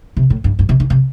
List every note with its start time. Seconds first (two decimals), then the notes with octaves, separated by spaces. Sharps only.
0.17 C3
0.30 A2
0.44 G2
0.59 G2
0.69 C3
0.80 D3
0.90 C3